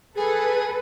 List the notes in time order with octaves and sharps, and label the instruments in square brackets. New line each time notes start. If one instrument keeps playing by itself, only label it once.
[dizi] G#4 [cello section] A4 B4